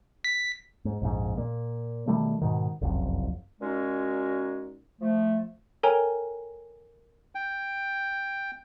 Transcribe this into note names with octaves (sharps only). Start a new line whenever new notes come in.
B6
G#2
A#1 F2 G#2
A#2
B2 D#3 G3 A3
G#2 B2 D#3
F#1 C2 F2
A#2 G#3 C#4 D#4 F#4
F3 A3
A4 A#4 C#5 G5 G#5 A#5
G5